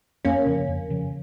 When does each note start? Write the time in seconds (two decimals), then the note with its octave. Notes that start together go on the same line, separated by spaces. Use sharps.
0.25 F2 A#3 C#4
0.46 C#3 F3
0.68 F2
0.90 C#3 F3